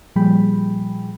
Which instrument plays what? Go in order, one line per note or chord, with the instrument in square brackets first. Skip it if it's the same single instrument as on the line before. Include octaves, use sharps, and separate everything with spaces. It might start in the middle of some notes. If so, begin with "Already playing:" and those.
[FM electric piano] A#2 F3 G3 G#4 G5 B5